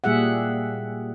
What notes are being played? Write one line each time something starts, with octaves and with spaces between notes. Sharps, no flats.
A#2 G3 G#4 E5 F#5